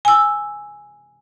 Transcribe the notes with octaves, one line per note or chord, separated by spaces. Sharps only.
G#5 E6